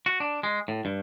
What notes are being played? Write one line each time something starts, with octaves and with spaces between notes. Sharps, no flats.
F#4
D4
G#3
A2
G2